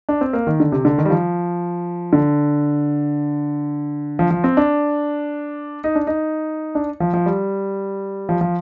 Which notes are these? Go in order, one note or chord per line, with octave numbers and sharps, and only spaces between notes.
D4
C4
A#3
D#3
D3
C3
D3
D#3
G3
F3
D3
F3
F3
C4
D4
D#4
D4
D#4
D4
F3
F3
G3
F3
F3